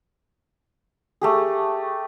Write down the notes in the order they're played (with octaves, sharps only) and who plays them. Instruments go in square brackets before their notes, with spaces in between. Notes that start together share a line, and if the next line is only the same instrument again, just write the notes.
[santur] A3 G4 G#4